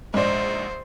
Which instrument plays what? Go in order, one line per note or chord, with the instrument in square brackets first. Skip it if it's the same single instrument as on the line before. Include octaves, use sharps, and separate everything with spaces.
[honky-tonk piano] A#1 G#2 [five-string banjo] G#3 D4 D5 [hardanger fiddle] C5